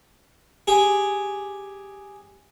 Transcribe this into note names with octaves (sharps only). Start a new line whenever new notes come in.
G4 G#4